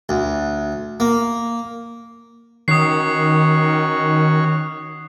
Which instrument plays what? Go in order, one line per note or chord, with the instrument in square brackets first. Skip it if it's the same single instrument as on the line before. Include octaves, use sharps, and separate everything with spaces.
[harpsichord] D2
A#3
[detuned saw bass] D#3 [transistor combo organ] C#4 F#4 C#5 [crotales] D#6 C7